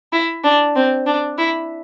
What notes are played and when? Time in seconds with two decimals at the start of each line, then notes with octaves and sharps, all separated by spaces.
0.13 E4
0.44 D4
0.76 C4
1.06 D4
1.38 E4